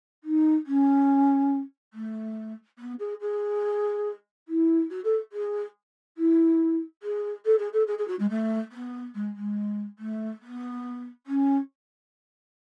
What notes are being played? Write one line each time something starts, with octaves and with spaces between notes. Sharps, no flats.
D#4
C#4
A3
B3
G#4
G#4
E4
F#4
A4
G#4
E4
G#4
A4
G#4
A4
G#4
G#4
F#4
G#3
A3
B3
G#3
G#3
A3
B3
C#4